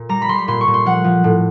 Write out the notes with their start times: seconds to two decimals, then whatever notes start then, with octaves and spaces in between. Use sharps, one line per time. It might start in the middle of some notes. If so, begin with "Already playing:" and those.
Already playing: A#2
0.09 G3 A#5
0.22 B5
0.29 G3 C6
0.39 B5
0.48 A#2 C6
0.61 C#6
0.67 A#2
0.74 C6
0.85 F3 F#5
1.04 F3
1.24 A2